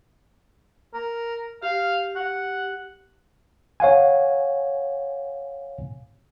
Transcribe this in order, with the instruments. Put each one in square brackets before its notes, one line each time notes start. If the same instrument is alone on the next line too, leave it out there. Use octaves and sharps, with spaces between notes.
[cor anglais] A#4
[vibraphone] G4 [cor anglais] F5
[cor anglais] F#5
[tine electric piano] C#5 F5 F#5 G#5